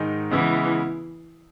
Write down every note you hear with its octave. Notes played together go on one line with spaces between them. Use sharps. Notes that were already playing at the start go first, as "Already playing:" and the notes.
Already playing: G#2 D#3 G#3 D#4
C#3 E3 G#3 B3 E4